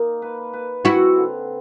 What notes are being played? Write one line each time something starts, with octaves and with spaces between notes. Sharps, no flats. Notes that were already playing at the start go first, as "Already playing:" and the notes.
Already playing: A#3 D#4
B4
B4
C4 E4 F#4
D3